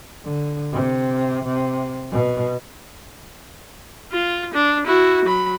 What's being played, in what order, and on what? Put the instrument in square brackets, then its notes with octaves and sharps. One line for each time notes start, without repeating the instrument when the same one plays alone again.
[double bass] D3
C3
C3
B2
[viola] F4
D4
E4 F#4
F#3 B5